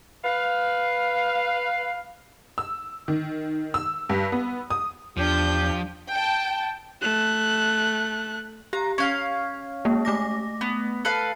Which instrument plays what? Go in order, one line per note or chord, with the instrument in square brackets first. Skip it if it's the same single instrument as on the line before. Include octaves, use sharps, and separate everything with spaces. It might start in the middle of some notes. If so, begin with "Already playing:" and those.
[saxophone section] B4 F5
[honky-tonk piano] E6
D#3
E6
G2
B3
D#6
[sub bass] E2 [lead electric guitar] F3 [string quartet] D4 G6 [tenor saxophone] G4
[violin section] G5 A5
[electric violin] A3 F#6
[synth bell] G4 [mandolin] A#5
[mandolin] C#4 F5 [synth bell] G#6
[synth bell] G#3 A#3
A3 D6 A#6
[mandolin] B3
A4 B4 F5